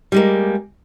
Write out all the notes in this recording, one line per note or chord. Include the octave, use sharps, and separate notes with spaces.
G3 G#3 A#3